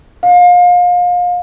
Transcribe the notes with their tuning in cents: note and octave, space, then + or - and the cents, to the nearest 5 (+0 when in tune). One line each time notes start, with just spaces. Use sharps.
F5 +30